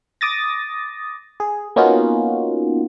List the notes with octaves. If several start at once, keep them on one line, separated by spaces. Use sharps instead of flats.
D6 D#6 A6 A#6
G#4
A#3 B3 C#4 D#4 F4 F#4